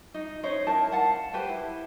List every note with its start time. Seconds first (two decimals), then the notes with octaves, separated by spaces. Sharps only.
0.14 D#4
0.43 C#4 D#4 C5 C#5
0.67 E4 A#4 A5
0.91 F5 F#5 A5
1.33 G4 B4 C5 G5
1.49 E4